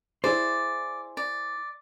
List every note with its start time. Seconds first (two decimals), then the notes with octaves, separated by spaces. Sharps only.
0.24 E4 G#4 C5 D5
1.17 D5